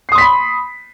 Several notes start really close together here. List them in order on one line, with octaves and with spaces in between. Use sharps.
C7 D#6 C6 B6 B5